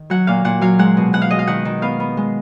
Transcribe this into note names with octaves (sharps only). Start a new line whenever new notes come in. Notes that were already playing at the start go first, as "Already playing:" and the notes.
Already playing: D#3
F#3 F#5
A#2 F5
A#2 F#5
F#3 F5
G#3 F#5
B2
B2 F#5
F5
G#3 D#5
F5
D#3 F#5
D#3
B3 F5
B3
G#3